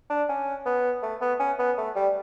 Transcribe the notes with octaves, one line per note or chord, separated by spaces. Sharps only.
D4
C#4
B3
A3
B3
C#4
B3
A3
G3